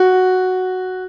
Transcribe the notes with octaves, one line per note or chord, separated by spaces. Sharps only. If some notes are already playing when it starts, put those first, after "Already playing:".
Already playing: F#4